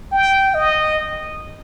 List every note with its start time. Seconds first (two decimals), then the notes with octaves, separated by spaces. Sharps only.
0.12 G5
0.54 D#5